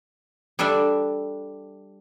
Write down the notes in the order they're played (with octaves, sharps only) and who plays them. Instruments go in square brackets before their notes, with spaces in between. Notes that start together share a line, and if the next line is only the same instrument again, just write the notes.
[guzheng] G3 D4 A4 D5 E5